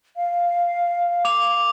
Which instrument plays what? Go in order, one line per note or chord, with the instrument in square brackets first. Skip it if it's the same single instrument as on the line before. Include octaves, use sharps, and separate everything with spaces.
[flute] F5
[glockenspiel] D6 F7